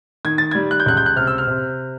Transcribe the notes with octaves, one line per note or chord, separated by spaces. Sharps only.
D#3 G#6
A6
G3 G#6
F#6
G6
C#2 F#6
G6
F#6
C3 F6
E6
F6
C3